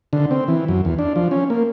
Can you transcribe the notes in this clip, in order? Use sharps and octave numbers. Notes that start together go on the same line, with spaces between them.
D3
C4
E3
F#2
E2
D4
F3
C#4
A#3